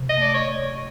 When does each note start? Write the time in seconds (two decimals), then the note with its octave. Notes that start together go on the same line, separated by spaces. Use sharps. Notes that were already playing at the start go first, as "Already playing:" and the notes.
Already playing: C3
0.09 D#5
0.17 A3 D5
0.34 C#5